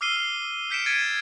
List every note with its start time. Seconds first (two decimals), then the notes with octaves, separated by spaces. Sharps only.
0.01 D6 E6 F6 C7 D#7 G7
0.16 G7
0.70 F6 G6 B6 C#7 D7 E7
0.86 G#6 A6 D7 D#7